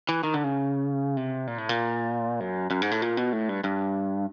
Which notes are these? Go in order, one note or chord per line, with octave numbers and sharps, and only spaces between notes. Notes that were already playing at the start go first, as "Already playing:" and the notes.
E3
D#3
D3
C#3
C3
A#2
A2
A#2
F#2
F#2
G#2
A2
A#2
B2
A2
G2
G2